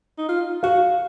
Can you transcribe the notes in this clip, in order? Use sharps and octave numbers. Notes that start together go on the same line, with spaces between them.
D#4
F4
F#4 F5